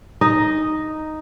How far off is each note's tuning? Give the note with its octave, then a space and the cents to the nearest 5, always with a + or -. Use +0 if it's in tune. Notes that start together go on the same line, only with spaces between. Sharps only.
D#4 +0 D#5 +0